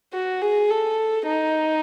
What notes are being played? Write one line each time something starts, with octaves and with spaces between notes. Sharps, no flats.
F#4
G#4
A4
D#4